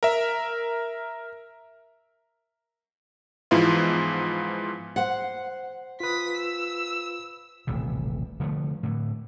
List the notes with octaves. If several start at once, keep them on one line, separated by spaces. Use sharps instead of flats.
A#4 E5
G#2 E3 F3 B3 E4 F4
C5 F#5
F4 B4 D#6 B6
E6
D#1 A1 C3
D3 F3 G3 A3
A2 D3